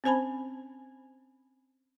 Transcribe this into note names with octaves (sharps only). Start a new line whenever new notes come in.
C4 C#4 C5 G#5 A5 B5